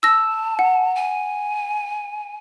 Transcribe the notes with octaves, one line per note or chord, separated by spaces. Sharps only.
A5 E6 A#6
F#5
G#5